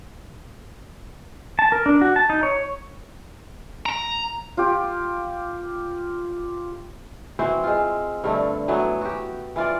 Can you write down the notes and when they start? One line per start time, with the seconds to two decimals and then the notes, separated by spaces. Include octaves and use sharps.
1.59 A5
1.72 A#4
1.86 D4
2.01 F#4
2.16 A5
2.30 D#4
2.43 C#5
3.86 A#5
4.57 F4 G4
7.39 E3 C4 F#4 C5
7.64 G#3 F4
8.24 G2 D3 A3
8.68 E3 F#3 A3 B3
9.02 F#4 G4
9.56 E3 F4 D5